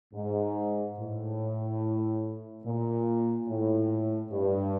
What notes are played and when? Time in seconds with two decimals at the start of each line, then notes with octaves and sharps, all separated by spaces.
0.14 G#2
0.98 A2
2.65 A#2
3.48 A2
4.32 G2